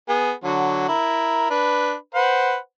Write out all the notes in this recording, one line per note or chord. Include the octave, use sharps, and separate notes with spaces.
B3 G#4
D3 F#3 F#4
E4 A#4
D4 B4
B4 C5 F#5